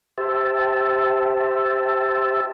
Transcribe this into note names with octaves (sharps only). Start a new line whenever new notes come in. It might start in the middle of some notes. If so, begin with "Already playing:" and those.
G4 C5 E5 A5